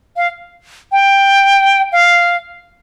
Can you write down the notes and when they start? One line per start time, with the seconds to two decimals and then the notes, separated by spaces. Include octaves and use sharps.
0.17 F5
0.92 G5
1.92 F5